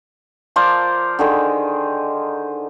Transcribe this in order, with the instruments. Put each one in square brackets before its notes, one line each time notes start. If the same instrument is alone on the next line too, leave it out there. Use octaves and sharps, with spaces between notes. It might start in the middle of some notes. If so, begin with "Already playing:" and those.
[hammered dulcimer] F3 A#4 C5 D5
D3 D#3 G#4